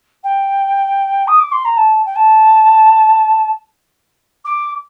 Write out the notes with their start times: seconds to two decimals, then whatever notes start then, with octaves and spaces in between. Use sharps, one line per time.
0.23 G5
1.27 D#6
1.39 D6
1.52 C6
1.64 A#5
1.76 A5
2.05 G5
2.15 A5
4.44 D6